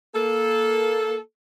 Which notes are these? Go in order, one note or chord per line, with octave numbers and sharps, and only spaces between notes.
A#3 A4